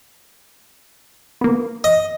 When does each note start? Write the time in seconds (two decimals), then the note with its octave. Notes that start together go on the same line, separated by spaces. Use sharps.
1.41 A#3 B3
1.84 D#5